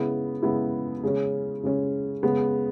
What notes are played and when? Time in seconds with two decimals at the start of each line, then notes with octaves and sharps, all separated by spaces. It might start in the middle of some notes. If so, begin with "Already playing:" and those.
Already playing: C#3 G#3 B3 E4
0.42 C#3 G#3 B3 E4
1.03 C#3 G#3 C#4
1.63 C#3 G#3 C#4
2.23 C#3 G#3 B3